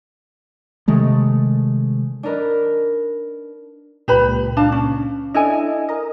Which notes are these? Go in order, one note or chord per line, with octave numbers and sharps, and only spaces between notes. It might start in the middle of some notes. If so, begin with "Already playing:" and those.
C3 D#3 G#3 A3
D4 D#4 A#4 B4
C#2 A#2 G4 B4 B5
D4 F5 A5
C#4
D4 E4 A4 D#5 G#5
A#4 D#5